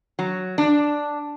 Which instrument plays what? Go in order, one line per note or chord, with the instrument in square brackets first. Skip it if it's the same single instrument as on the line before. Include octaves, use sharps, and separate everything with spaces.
[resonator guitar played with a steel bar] F#3
D4